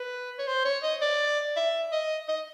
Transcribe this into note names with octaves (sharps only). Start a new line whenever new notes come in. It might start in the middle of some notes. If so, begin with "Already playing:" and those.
Already playing: B4
C#5
C5
C#5
D#5
D5
E5
D#5
D#5